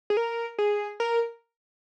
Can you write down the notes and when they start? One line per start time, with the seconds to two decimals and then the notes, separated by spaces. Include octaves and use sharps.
0.10 G#4
0.17 A#4
0.58 G#4
1.00 A#4